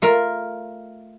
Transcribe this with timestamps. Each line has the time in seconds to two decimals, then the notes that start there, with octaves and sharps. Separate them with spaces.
0.02 A3 F4 A#4